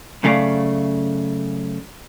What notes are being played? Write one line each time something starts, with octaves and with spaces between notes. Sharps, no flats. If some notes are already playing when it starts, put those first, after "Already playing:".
F#2 C#3 A3 G#4 D5 F5